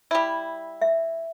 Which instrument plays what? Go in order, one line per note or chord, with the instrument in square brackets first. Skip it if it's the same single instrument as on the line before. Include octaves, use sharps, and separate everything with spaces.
[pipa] G3 E4
[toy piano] E5